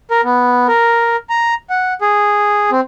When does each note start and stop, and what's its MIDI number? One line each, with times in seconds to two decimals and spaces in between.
0.11 0.21 70
0.24 0.67 59
0.68 1.16 70
1.30 1.54 82
1.70 1.93 78
2.01 2.70 68
2.71 2.80 60